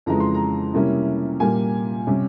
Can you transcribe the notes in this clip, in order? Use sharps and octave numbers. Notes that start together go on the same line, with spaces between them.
F2 C#3 E3 G#3 A#5
C6
A#5
C3 G3 A#3 C#4 E4
A#2 G3 A#3 G#5
C3 G3 C#4